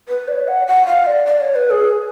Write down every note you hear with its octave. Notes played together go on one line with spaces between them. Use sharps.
B4
D5
C#5
F#5
F#5
F5
D5
D5
C#5
B4
G#4